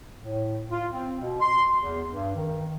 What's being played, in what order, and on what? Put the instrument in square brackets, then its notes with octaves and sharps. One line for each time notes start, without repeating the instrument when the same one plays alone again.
[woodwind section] A2
F4
C4
B2
C6
E2
G2
D#3